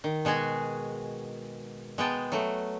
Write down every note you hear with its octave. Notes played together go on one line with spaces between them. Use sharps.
D#3
B2 G#3 F#4 G#4 G#5
G#3 B3 G5 A5
F#3 A3